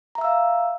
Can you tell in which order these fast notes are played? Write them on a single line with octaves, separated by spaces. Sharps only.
A#5 E5 E6 F5